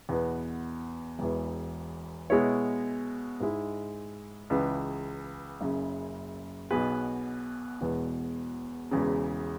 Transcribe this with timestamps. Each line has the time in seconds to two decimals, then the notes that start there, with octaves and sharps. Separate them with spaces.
0.09 E2 B2 B3
1.19 E1 E2 E3
2.30 B2 G#3 E4 C#5
3.40 G#2 G#3 E4
4.50 C#2 C#3 E3
5.61 F#1 F#2 C#3
6.71 B1 B2 B3 G#4 B4
7.81 E1 E2 B2
8.91 E1 E2 C#3